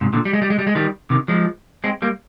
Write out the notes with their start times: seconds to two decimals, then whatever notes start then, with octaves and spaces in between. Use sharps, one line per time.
0.01 G#2 C3
0.13 A#2 D3
0.25 G3
0.33 G#3
0.42 G3
0.50 G#3
0.59 G3
0.67 G#3
0.75 D#3 G3
1.10 C3 D#3
1.28 F3 G#3
1.84 G#3 C4
2.02 G3 A#3